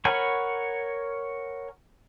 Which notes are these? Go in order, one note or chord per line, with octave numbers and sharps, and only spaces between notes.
A#4 C#5 F#5 G#5 B5